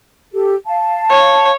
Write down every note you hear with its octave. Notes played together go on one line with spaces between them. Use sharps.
G4 A4
F5 A5
C#5